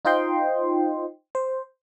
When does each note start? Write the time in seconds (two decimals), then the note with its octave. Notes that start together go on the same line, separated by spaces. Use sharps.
0.05 D#4 F4 C5 D#5 G5 C6
1.35 C5